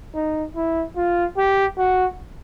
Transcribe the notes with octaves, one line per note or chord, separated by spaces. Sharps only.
D#4
E4
F4
G4
F#4